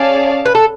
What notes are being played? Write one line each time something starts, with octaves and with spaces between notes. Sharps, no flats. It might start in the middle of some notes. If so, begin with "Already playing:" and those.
Already playing: C#4 G#4 D5 F5 A5
B4
A4